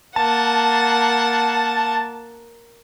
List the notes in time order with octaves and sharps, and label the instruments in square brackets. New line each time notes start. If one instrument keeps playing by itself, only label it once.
[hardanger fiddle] A#3 F#5 [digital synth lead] A5